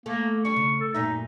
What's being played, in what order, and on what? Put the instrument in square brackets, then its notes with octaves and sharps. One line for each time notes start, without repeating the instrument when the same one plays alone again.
[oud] A3 A4 [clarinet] A#3
[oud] G3 D4 [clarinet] C#6
[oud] C#3
[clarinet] A4
[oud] F#2 A#2 E5 [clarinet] D#4